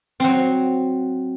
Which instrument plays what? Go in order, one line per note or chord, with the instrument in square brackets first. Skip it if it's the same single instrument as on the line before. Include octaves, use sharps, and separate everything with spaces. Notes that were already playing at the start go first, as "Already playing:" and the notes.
[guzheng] F#3 C4